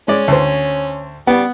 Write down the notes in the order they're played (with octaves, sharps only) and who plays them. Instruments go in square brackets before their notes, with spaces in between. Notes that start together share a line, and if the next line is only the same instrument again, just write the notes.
[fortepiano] G#3 D5 [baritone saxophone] C#4
[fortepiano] D2 C5
[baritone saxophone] G3 [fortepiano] B3